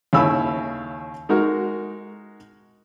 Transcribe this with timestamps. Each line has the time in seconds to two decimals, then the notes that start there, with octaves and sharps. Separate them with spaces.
0.13 D#2 C#3 E4 G#5 B5 E6
1.29 G#3 D#4 F#4 A#4